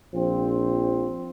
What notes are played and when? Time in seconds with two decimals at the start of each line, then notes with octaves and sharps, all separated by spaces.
0.14 A#1 F3 C4